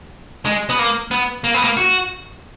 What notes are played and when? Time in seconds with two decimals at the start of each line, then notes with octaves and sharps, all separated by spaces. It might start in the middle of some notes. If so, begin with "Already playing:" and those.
0.45 G#3
0.69 B3
0.79 A#3
1.11 B3
1.44 A#3
1.54 B3
1.64 A#3
1.77 F#4